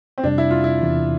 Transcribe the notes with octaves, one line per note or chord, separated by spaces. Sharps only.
C4
F2 C3 G3 D4
E4
F4
E4
E2 C3 E3